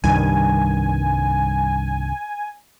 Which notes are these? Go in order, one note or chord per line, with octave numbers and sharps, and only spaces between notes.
C2 G2 D#3 G#5